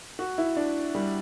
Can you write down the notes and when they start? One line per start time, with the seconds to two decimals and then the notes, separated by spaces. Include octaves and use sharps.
0.19 F#4
0.38 E4
0.57 D4
0.95 G3